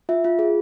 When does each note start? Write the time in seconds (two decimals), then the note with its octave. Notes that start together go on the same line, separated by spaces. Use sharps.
0.09 F4 E5
0.24 F4
0.39 G#4